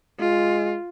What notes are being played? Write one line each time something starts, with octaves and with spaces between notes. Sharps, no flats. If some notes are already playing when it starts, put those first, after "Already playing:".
G#3 F4